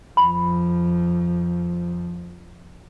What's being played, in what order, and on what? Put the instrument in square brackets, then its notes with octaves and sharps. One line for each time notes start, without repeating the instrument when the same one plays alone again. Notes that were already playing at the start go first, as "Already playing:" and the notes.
[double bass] F2 F3 [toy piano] B5